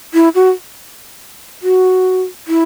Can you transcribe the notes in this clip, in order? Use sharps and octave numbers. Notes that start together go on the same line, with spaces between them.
E4
F#4
F#4
E4